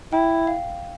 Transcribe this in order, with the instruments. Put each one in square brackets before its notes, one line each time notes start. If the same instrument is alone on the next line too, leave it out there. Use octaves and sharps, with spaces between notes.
[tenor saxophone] E4 [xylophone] G5
[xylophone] F5